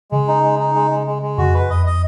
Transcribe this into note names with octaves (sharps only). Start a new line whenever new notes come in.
C#3 G#3
D#4
G#3
D#4
G#3
G#3
G#3
G#3
F2 F#4
B4
F#2
F2 D#5
D#5